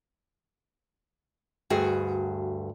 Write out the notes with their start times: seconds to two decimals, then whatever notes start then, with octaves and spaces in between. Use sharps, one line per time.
1.70 D2 G2 F#4 G#4